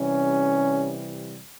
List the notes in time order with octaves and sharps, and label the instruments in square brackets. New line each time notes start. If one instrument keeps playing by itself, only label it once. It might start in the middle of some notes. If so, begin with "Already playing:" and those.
Already playing: [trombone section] C3 E3 G3 C#4